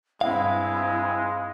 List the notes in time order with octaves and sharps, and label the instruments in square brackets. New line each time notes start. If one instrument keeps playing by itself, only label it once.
[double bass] G2 C4 [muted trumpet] G#3 [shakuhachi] E4 [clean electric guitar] F5